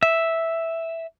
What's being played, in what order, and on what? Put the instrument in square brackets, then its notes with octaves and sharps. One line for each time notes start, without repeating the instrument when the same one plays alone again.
[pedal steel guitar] E5